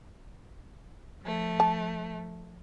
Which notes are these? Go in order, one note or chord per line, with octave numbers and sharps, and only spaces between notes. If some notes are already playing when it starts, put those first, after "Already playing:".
F3 A3
A5